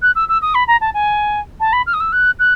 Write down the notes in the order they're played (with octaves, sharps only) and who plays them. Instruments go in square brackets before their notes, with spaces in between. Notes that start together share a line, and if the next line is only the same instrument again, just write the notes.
[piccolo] F#6
E6
E6
D#6
B5
A#5
A5
G#5
A5
B5
F6
D#6
E6
F#6
F#6